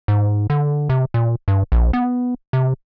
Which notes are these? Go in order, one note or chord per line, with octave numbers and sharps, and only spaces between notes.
G#2
D3
C3
A#2
G2
A#1
B3
C3